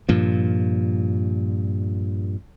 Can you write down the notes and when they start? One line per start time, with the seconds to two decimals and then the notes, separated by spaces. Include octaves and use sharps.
0.09 G2 A#2 F3